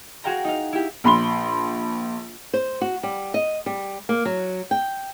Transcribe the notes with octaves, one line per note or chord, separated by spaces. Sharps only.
F#4 G#4 F5 G5 A#5
D#4 F5
E4 G4
A#1 B5 C6 G7
C5
F#4
G3
D#5
G3
A#3
F#3
G5